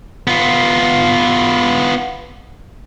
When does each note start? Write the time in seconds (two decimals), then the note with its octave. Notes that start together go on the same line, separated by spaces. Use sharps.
0.27 B3 F4